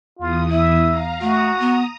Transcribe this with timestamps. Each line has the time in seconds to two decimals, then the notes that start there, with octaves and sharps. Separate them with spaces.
0.19 E2 F4 D#6
0.51 E4 E5
0.89 F5 A#5
1.21 A3 F#4 A#5 D#6
1.59 B3